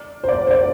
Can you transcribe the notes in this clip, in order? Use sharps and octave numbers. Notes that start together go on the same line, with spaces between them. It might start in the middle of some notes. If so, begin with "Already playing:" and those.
Already playing: D5
C5
D5
C5
D5